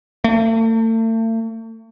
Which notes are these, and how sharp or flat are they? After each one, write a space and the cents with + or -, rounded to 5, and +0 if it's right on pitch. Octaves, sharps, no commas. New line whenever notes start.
A3 +40